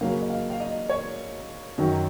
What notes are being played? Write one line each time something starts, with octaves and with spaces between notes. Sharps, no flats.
C#3 F#3 A#3 C#4 F5
D#5
F5
F5
D#5
C#5
F#2 D#3 F#3